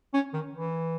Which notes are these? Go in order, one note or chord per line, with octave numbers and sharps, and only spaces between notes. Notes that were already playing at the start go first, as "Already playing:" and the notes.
C#4
D#3
E3